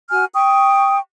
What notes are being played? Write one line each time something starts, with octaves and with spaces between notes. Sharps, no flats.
F#4 G#5 F6
G5 C#6 D#6